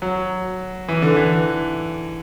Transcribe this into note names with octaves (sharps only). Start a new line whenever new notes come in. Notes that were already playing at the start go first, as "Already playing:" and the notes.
F#3
E3
D3
E3